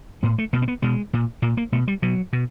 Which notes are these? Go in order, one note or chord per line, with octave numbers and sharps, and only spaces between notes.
A2 B3
A3
B2 A#3
C4
B3
B2 G#3
A#2
A#2 A#3
A#3
B2 A3
G3
B2 F#3
B2